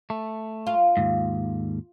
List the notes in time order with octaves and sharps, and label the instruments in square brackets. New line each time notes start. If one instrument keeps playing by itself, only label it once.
[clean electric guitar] A3
[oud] F4
[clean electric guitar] D#2 G#2